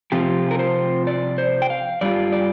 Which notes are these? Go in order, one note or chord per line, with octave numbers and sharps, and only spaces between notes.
C3 F3 C4 F4 G4
A#4
C5
D5
C5
G5
F5
G2 G3 F4 D5
D5